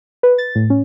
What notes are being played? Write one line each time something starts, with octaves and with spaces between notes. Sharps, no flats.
B4
A6
A2
C#4